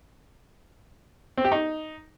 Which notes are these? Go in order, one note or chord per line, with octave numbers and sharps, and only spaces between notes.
C4
G4
D#4